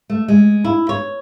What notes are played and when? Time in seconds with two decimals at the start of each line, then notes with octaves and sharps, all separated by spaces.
0.10 A3
0.28 G#3
0.64 E4
0.89 C#5